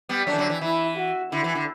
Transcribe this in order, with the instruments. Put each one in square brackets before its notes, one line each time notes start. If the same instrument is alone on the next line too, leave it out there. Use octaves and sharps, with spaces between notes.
[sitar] G3 B3
[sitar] F#3 A3 [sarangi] D4
[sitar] E3
D3 F#3
E3
[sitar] E3 [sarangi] E4
[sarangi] F#4
[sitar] D3 [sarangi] E4
[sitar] E3
D3